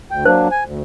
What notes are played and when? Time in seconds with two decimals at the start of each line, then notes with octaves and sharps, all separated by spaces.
0.11 D2 G5
0.25 F#3 A#3 D4 C5
0.51 G#5
0.65 D2